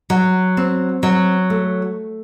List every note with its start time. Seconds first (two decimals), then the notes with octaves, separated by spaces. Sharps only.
0.10 F#3
0.57 C4
1.03 F#3
1.50 A3